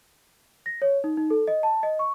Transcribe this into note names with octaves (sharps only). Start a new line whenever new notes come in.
A#6
C#5
D#4
D#4
A4
D#5
A5
D#5
C#6